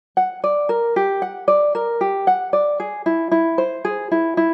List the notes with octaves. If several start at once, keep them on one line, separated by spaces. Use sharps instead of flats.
F#5
D5
A#4
G4
F#5
D5
A#4
G4
F#5
D5
G#4
E4
E4
C5
G#4
E4
E4